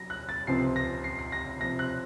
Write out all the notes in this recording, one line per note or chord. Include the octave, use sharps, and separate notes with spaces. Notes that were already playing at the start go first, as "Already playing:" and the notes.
Already playing: F#3 A#6
F#6
A6
C#2 C3 F3 C4 C7
A#6
C7
C7
A#6
C3 F3 C4 A#6
F#6